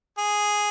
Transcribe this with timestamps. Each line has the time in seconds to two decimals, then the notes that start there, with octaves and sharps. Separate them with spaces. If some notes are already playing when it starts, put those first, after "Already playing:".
0.18 G#4